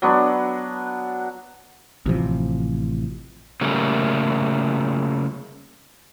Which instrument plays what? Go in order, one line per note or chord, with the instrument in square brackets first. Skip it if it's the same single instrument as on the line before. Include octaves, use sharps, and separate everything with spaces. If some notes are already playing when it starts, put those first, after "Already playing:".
[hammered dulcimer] F#3 B3 D4
[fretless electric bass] A1 C3 F3
[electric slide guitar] C#3 G3 A3 A#3